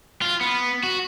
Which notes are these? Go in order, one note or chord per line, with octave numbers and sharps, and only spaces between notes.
F4
B3
F#4